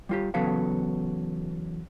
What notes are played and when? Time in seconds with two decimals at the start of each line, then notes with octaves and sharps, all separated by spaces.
0.09 G3 F4 G4
0.34 E2 C#3 F#3 B3 A4 F5